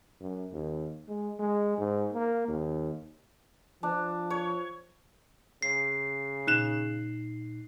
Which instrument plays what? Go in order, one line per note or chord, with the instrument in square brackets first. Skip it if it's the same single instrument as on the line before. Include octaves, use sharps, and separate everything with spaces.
[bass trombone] F#2
D#2
G#3
G#3
G#2
A#3
D#2
[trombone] F3 [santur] D4
[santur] C#5
[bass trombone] C#3 [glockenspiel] C7
[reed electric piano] A#2 D#4 [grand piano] F#6 E7